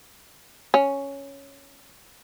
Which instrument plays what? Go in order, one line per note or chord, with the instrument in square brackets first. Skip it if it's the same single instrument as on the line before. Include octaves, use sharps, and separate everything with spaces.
[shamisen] C#4